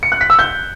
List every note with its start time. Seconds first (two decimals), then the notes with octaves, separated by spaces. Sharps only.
0.03 C#7
0.12 F#6
0.21 B6
0.30 E6
0.39 G6